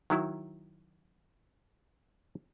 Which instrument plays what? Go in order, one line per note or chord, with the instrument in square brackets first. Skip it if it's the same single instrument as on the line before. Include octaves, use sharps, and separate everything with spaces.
[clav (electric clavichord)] D#3 F#3 E4